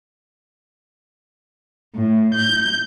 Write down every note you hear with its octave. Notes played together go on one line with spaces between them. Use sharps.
A2
G6